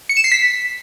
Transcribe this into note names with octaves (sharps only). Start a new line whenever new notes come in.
C#7
E7
C7
B6